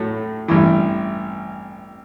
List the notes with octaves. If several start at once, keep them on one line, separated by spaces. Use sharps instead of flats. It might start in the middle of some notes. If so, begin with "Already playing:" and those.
Already playing: A2 F#3 A3
A1 G2 E3